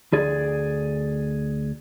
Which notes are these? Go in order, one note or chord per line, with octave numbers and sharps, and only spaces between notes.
D2 G#4 D5